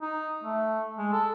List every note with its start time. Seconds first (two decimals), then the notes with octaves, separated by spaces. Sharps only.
0.02 D#4
0.44 A3
0.98 G#3
1.12 A4